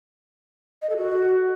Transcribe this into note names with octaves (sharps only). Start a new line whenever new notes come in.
D#5
A4
F#4